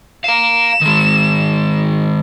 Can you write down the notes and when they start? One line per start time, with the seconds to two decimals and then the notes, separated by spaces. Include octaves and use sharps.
0.24 F5 A#5 E7
0.81 D#3 G#3